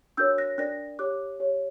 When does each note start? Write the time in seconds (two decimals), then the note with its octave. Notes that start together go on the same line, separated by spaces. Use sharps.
0.17 D4 F#4 A#4 C#5 E6 G6
0.38 F#6 A#6
0.58 D4 A#4 D5 F#6 A#6
0.99 G4 C#5 D6 F#6
1.40 G4 C#5